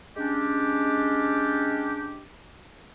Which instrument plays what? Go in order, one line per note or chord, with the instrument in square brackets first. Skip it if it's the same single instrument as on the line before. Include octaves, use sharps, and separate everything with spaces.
[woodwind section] G#3 C#4 D4 G4